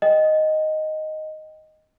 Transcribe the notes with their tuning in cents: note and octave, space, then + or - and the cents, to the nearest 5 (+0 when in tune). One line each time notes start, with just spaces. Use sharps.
D#5 +0 G5 +0